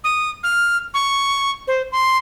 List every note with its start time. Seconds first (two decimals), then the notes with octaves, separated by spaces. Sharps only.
0.04 D#6
0.43 F6
0.94 C#6
1.68 C5
1.92 C6